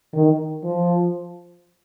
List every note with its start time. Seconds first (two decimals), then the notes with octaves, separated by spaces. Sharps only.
0.13 D#3
0.64 F3